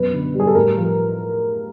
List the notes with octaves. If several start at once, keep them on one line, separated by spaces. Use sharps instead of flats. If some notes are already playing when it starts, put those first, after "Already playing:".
Already playing: F#2 B2 B4
D3
G3
G#4
A4
A2 A#4
F3